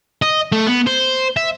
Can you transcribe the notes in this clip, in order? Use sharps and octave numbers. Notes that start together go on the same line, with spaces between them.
D#5
A3
B3
C5
E5